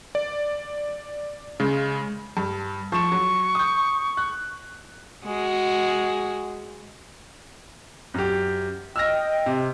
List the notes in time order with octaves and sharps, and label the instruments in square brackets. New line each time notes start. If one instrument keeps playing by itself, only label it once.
[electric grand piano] D5
C#3 G#3 C#4
[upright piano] G2
[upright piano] F3 E7 [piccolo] C#6
[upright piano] F#3
D#6 G6
F#6
[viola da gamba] G#3 F#4 G#4
[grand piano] F#2 G4
[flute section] D#5 G5 [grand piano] E6 F6 A#6
[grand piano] C3